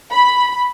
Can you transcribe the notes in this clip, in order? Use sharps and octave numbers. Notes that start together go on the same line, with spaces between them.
B5